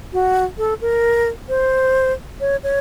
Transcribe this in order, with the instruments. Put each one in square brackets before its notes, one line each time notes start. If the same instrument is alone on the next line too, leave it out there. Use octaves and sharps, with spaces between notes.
[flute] F#4
A4
A#4
C5
C#5
C#5